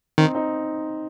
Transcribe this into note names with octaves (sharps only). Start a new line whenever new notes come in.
D#3 C4 D#4
C4 D#4